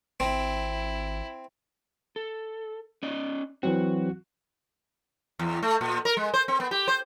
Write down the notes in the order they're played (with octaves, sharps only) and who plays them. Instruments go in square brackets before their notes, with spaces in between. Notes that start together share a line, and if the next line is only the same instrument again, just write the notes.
[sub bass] G#1 [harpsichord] C4 [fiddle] E4
[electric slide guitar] A4
C#4 D5 D#5
[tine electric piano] E3 F#3 C4 [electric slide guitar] F#4
[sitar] E2
A3
A#2
A#4
G#3
C5
C4
B3
G4
C5